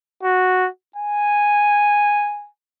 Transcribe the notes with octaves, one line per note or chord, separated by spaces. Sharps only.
F#4
G#5